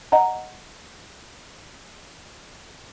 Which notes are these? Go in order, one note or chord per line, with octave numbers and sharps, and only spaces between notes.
D#5 F#5 A#5